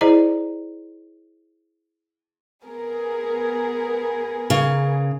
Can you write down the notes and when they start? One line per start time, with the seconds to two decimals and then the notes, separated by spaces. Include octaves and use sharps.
0.01 E4 G#4 C5 D5 D#5 A#5
2.64 B3 G#4 A#4
4.50 C#3